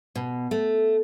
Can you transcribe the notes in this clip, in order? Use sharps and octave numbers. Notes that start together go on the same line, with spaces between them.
B2
A3